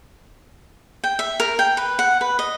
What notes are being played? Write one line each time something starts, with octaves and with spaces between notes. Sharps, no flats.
G5
E5
A#4
G5
B4
F#5
B4
D#5